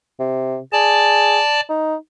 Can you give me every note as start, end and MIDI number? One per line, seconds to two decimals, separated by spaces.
0.19 0.59 48
0.72 1.39 68
0.72 1.60 74
0.72 1.60 81
1.69 1.95 63